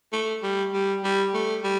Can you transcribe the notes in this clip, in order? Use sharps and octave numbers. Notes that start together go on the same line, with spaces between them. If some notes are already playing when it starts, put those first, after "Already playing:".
A3
G3
G3
G3
A3
G3